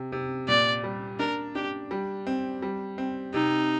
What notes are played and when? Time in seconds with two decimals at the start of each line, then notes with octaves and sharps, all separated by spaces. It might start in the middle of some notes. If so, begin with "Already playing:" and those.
Already playing: C3
0.12 C3
0.48 A#2 D5
0.84 G3
1.19 D4 A#4
1.55 D4 G4
1.91 G3
2.27 C4
2.62 G3
2.98 C4
3.34 C3 D#4